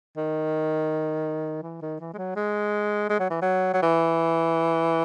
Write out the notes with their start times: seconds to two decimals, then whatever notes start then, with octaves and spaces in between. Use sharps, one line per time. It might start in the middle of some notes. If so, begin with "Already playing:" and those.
0.17 D#3
1.63 E3
1.82 D#3
2.00 E3
2.14 G#3
2.18 F#3
2.36 G#3
3.10 G#3
3.20 F#3
3.30 E3
3.42 F#3
3.74 F#3
3.83 E3